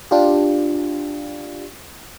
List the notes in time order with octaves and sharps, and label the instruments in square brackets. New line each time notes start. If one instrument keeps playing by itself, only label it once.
[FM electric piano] D4 F4 G4